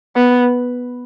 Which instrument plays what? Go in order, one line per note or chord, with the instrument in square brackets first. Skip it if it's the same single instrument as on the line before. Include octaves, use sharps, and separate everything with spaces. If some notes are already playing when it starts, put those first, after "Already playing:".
[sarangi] B3